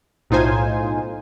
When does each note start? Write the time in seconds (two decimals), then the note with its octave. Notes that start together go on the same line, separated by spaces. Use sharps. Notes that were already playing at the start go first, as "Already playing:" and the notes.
0.30 B1 A2 D#4 F4 C5 G#5